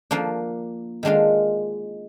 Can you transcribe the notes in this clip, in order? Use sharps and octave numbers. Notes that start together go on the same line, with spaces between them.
F3 A#3 D4
D#3 G#3 D4 F4